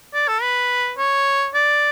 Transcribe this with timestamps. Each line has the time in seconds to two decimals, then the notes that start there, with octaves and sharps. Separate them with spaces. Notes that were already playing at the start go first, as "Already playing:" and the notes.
0.14 D5
0.28 A4
0.42 B4
0.98 C#5
1.54 D5